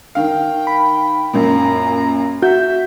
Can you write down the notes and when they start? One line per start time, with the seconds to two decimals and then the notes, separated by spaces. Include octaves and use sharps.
0.15 D#3 F5 G5
0.67 B5
1.33 F#2 A#2 A#5
2.42 F#4 E5 G6